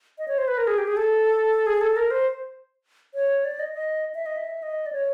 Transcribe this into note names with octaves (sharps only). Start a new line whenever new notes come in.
D#5
C#5
C5
B4
A#4
G#4
G4
G#4
A4
G#4
A4
A#4
C5
C#5
D5
D#5
D#5
E5
D#5
E5
D#5
D5
C#5